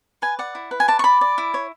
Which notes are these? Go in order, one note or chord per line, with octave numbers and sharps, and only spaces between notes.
B4 G#5
D5 F#5
E4
B4
G#5
D5 A5
C#6
D5 B5
D5
E4
C#5